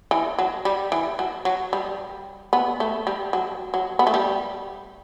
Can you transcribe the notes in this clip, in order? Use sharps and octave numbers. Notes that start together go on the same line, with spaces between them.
E3
F#3
G3
E3
F#3
F#3
G3
B3
A3
G3
F#3
F#3
B3
A3
G3